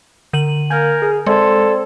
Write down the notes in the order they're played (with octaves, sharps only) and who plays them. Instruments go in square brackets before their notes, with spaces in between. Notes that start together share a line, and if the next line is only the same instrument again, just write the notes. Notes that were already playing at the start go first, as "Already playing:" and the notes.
[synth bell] D3 D#7 F#7
[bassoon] A#3 [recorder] A#4 [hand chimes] G#5 G6 G#6
[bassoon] G#4
[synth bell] G#3 [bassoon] C4 [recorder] A4 [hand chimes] D5 C6 G#6